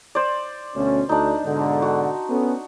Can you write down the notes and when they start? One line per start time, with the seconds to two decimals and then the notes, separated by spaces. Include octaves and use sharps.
0.15 C5 D5
0.75 D2 B2 C#4
1.09 D2 D4 D#4
1.45 G#2 B2 D3
1.82 F#4
2.30 B3 C#4 A4